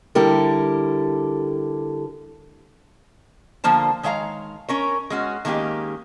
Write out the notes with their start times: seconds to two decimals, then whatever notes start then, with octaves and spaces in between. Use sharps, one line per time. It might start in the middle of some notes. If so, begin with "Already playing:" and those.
0.15 D3 G3 E4 G4 A4 A#4
3.64 D3 F3 A#3 C5 A5
4.03 D#3 G#3 C#5 F5 A#5
4.69 C#4 A#4 C#5
5.10 G#3 C#4 F#4
5.45 D#3 G#3 A#3 C#4 G4